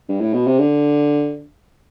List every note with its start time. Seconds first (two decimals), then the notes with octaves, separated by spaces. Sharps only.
0.09 G2
0.21 A2
0.34 B2
0.47 C3
0.59 D3